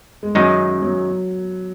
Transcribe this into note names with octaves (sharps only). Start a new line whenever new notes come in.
G#3
F#2 D#3 F#3 G#3 D#4
F#3